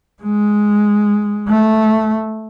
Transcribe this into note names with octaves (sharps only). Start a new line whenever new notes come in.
G#3
A3